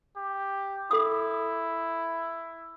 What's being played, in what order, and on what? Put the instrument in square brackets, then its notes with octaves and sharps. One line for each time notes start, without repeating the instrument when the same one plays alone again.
[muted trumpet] G4
[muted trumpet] E4 [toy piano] A4 D#6